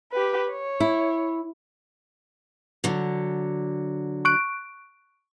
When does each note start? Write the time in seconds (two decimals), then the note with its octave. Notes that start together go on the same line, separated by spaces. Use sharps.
0.12 G4 B4
0.50 C#5
0.80 E4
2.84 D3 F#3
4.25 C#6 F#6 D7